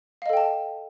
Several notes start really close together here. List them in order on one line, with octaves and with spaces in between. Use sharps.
F5 D#5 A4 G5 A5